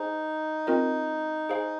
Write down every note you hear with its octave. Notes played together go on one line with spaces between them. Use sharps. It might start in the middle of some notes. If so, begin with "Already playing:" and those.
Already playing: D#4 G#4 C5 G#5
C4 F4 A#4 D#5
G#4 C5 F5 G#5